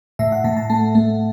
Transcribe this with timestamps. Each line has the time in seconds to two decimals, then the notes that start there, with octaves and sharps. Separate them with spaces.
0.19 A2 E5
0.32 F#5
0.44 A2 A5
0.57 A5
0.70 A3 A5
0.95 A3